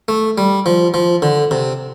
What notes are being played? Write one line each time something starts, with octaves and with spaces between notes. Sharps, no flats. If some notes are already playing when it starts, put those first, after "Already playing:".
A3
G3
F3
F3
D3
C3